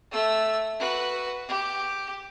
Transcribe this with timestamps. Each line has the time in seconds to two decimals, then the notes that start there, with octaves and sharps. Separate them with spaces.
0.11 A3 E6
0.79 F#4 B4
1.48 G4